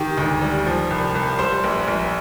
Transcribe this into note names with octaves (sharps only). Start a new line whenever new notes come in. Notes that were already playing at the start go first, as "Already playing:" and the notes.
Already playing: D#3 G4
D2
G3
F3
C2
C2
G3 C5
A#1
A#1